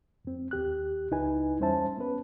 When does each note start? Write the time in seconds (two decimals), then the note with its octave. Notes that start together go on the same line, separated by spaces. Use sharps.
0.25 F2 C4
0.51 D#2 G4 F#6
1.11 C#2 D#4 E4 B4 G#5
1.59 E2 G3 C#4 C5 E5 A5
1.97 B3 C#4 B4